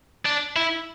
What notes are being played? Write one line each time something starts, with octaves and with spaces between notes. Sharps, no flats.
D4
E4